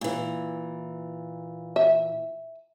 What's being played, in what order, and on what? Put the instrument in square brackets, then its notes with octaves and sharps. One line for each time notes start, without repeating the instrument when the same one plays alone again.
[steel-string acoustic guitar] A#2 E3
[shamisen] E5